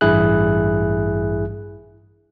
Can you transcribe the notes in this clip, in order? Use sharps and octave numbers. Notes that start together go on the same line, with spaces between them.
A1 G2 E4 G#4 F#6